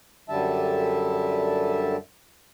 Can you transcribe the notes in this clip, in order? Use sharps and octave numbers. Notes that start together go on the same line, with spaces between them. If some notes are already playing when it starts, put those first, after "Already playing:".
F#2 D3 G3 E5 A5